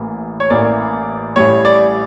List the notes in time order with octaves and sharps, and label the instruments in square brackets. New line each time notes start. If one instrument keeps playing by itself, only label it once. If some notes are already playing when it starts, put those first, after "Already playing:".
Already playing: [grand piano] A1 A2 E3 A#3
C#5
A1 A2 E3 A#3 D5
A1 A2 G3 C#5
D5